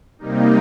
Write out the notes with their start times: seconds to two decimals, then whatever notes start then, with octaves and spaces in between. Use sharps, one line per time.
0.18 C3 G3 A#3 D#4